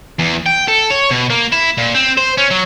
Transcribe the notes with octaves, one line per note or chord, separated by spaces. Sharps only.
E2
G5
A4
C#5
B2
A#3
E4
A#2
C4
C5
C#4
F#3